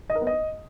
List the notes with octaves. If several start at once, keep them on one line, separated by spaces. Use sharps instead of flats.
D#5
A#4
B3
D#5